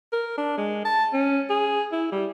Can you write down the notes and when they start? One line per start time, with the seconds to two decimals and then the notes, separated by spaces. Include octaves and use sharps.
0.12 A#4
0.38 D4
0.58 G#3
0.85 A5
1.13 C#4
1.50 G#4
1.92 E4
2.12 G3